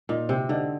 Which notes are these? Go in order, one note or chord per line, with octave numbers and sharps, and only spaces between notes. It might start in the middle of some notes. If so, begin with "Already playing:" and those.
A#2 D#4
C3 C4
D3 D#4